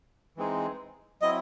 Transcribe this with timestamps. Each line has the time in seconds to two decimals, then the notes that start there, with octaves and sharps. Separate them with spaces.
0.37 E3 G#3 C4 D#4 G#4
1.21 F#3 C4 E4 D#5